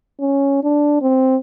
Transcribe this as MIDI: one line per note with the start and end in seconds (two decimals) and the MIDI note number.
0.20 0.59 61
0.64 0.97 62
1.02 1.36 60